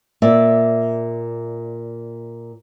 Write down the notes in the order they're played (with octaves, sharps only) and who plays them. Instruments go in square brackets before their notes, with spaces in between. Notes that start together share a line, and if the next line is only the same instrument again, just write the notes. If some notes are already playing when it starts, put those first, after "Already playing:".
[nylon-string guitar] A#2 D5 E5